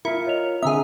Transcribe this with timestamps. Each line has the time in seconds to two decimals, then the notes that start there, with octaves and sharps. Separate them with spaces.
0.05 E4 F4 A#4 C#7
0.26 C#5 D#5 F7
0.62 D3 C4 G#4 E5 F#5 A#5 D#6